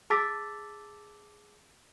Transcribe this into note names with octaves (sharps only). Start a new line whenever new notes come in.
G#4 A5 D6 E6 A6 B6